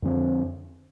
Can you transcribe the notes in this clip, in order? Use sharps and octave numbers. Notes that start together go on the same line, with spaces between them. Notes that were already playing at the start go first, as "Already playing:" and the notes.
F2 D3 F3 C4